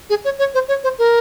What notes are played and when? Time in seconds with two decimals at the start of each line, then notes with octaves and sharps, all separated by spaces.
0.10 G#4
0.25 C#5
0.39 C#5
0.54 C5
0.68 C#5
0.84 C5
0.99 A#4